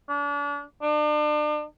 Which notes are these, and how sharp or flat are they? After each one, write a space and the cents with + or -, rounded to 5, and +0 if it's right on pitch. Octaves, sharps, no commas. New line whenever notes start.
D4 -35
D4 +40